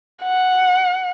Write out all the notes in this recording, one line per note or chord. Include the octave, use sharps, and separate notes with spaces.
F#5